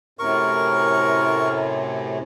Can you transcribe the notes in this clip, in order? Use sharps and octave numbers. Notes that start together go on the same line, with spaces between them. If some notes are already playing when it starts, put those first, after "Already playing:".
F#2 A2 C3 A#4 C#6